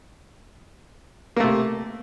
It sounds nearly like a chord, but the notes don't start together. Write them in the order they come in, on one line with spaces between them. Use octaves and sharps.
A#3 A3 C3